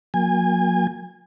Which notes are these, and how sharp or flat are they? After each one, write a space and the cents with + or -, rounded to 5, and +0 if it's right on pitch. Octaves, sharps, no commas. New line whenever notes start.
F#3 -40 A#3 +0 G#5 -25